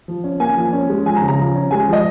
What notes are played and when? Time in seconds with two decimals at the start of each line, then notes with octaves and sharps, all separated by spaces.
0.08 F3
0.24 C#4
0.40 A#3 G#5
0.57 F3
0.73 C#4
0.89 G#3
1.06 F3 G#5
1.17 A#5
1.22 C#3
1.28 A#5
1.39 F3
1.56 C#4
1.71 G#3 G#5
1.88 F3 D#5